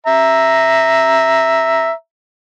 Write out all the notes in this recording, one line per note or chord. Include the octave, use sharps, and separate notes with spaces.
E5 A#5